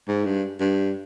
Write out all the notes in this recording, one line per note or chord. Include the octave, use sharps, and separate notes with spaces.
G#2
G2
G2